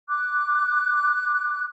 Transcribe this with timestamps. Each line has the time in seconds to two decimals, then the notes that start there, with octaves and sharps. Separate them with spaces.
0.08 D6 F#6